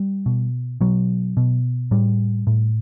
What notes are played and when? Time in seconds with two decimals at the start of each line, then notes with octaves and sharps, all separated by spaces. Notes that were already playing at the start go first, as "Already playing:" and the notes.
Already playing: G3
0.26 B2
0.81 B2 F#3
1.37 B2
1.91 A2 G3
2.47 A2